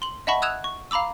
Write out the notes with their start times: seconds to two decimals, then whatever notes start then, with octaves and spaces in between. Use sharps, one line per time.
0.02 C6 F#7
0.27 D#5 E5 F#5 A5 B5 C#6
0.42 D#6 E6 F#6 G#6 E7 F7
0.64 C#6
0.91 F5 A#5 B5 D6 E6